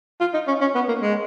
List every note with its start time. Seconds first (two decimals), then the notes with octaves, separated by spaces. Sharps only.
0.21 F4
0.34 D#4
0.48 C#4
0.61 C#4
0.75 B3
0.88 A#3
1.02 G#3